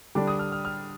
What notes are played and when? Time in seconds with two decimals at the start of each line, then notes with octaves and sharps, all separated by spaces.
0.15 D3 G3 D4 D6
0.28 D#6
0.39 F6
0.52 F6
0.65 F6